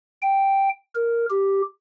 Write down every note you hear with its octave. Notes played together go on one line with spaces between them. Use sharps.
G5
A#4
G4